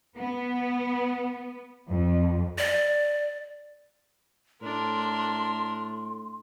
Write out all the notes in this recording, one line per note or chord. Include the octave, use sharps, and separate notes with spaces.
B3
F2
D5
A2 D4 A#4 C6